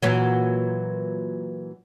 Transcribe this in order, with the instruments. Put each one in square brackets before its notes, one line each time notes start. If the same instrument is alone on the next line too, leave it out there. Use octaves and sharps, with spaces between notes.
[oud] A#2 E3 F#3